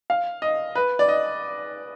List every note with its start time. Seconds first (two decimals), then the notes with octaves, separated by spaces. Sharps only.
0.10 F5
0.42 D#5
0.75 B4
0.99 D5
1.09 D#5